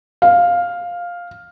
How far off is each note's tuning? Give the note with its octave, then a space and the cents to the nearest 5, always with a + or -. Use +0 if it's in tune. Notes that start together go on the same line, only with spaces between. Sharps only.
F5 +5